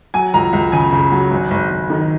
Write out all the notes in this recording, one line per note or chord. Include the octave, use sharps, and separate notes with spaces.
F#3 G#5
C#2 A#5
C#2
C#3 G#5
C#3
F#3
G#1
G#1
G#1
D#3